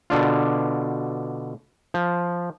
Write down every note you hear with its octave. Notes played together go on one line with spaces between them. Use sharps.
B2 D3 D4 F4
F3